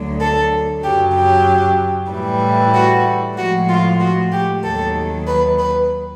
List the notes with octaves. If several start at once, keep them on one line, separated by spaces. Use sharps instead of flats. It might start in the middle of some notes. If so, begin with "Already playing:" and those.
Already playing: D2 D3 F#3
A4
F#2 C#3 F#3 G4
G4
A2 E3 G3
F#4
A2 F3 G#3 F#4
F4
F#4
G4
D#2 D#3 F#3 A4
B4
B4